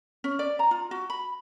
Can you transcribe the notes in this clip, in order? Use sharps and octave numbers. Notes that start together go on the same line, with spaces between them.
C#4
D5
A#5
F4
F#4
B5